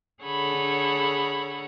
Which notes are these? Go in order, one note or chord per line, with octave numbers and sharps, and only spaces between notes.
D3 G#4 A4 C#5 F#5 B5